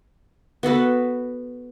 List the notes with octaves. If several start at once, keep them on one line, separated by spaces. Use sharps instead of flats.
B3 F#4 A4 B4